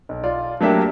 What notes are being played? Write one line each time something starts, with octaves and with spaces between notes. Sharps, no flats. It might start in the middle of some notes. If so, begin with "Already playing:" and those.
B1
F4 D5
F#3 A3 A#3 D4 G4 E5